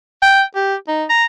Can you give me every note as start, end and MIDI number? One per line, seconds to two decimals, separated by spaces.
0.22 0.43 79
0.56 0.75 67
0.88 1.05 63
1.10 1.25 82